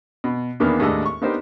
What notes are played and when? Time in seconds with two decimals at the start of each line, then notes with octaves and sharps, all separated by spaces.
0.24 B2
0.60 E2 D#3 A#3 B3 D4
0.80 D#2 A2 G#3 D4 A4 D#5
1.06 C#6
1.22 B3 D4 D#4 G4 A#4 C5